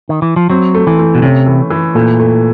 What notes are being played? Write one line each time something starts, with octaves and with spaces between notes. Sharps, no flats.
D#3
E3
F3
F#3 C4
A3
E3
A3
B2
C3 C#4
E3
E3
A#2 A3
A3